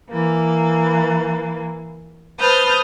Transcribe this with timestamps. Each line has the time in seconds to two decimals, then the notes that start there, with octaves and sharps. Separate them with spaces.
0.11 E3 A#3
2.39 B4 C5 A5 D#6 F6 G6